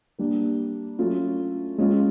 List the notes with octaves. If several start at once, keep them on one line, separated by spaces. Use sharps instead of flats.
G3 A#3 D4
F#3 A3 C#4 F4
G#3 C#4 F4